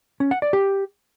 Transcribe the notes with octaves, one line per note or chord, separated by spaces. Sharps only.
C#4
F#5
D5
G4